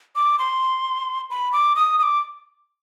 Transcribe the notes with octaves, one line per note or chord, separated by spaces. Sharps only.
D6
C6
B5
D6
D#6
D#6
D6